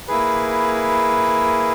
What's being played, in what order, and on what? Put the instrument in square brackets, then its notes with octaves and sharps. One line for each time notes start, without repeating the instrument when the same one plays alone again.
[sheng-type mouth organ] A#3 E4 G#4 B4